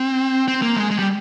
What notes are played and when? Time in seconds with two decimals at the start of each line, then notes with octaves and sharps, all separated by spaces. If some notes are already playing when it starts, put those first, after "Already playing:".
Already playing: C4
0.48 C4
0.62 A#3
0.76 G#3
0.91 G#3
0.99 G3